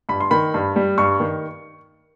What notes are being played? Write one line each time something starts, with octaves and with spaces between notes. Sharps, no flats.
G2 B5
C6
D#3 B5
G2
G3
G2 C#6
D#3